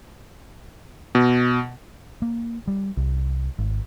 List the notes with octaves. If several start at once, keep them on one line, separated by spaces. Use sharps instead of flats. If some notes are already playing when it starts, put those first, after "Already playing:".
B2
A#3
G3
C2
G#1